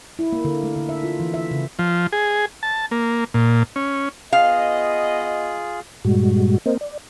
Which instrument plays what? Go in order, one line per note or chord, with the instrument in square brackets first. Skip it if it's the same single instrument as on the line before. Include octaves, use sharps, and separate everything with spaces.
[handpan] E4
A#3
D3
A3
D3
E5
F4
E3
E5
C#3
[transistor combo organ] F3
G#4
A5
A#3
A#2
C#4
[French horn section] B3 D#5 [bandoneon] F4 G#4 [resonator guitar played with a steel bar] F5
[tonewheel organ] G2 A#2 G3 G#3 F#4
A#3 C4 A#4 C5 D#5
D5